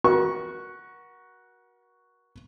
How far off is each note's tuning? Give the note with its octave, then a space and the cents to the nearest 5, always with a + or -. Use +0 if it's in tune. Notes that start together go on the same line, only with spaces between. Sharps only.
F#4 +0 A#4 +40 C#6 +0